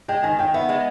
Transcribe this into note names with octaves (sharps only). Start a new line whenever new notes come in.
G#3 G5
D#3 G#5
D#3 G5
B3 E5
G#3